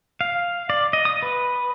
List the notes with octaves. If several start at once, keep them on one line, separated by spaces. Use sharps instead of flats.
F5
D5
D#5
D#6
B4